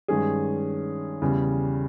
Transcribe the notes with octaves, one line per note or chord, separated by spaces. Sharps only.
G2 D#3 G#3 C#4 G#4
E2 C#3 G3